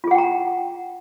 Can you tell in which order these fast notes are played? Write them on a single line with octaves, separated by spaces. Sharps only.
F4 G#4 F#5 G5 A#5